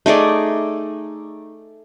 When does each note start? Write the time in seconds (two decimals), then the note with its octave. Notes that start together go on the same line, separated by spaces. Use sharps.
0.06 A3 D#4 G#4 D5